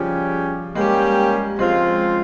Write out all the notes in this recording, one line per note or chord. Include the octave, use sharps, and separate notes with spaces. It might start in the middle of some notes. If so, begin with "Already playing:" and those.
Already playing: C#3 F3 G3 C#4 G4
G3 G#3 A#3 C#4 G4
C#3 F3 G#3 C4 F4